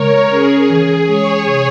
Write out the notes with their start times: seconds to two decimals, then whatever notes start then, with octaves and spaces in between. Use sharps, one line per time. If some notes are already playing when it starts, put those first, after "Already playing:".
Already playing: C#3 G#3 A#4 C#5
0.31 C#4 G#4
0.70 E3
1.08 G#3 C#5
1.47 C3